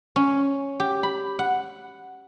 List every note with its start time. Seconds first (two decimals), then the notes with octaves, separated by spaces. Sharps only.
0.16 C#4
0.80 G4
1.03 B5
1.39 F#5